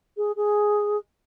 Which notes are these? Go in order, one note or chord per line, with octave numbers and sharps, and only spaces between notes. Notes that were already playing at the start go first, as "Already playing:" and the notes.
G#4
G#4